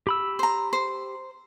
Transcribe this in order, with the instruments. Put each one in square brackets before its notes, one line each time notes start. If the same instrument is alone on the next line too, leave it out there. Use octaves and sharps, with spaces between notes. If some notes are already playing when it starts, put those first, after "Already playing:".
[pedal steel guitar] G4 B5 E6
[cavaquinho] C5 A#5
C5